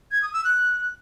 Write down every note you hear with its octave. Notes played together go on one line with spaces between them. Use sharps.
G#6
D#6
E6
F#6